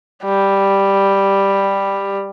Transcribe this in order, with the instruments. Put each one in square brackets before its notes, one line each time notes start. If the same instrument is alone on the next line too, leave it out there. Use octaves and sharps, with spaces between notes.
[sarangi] G3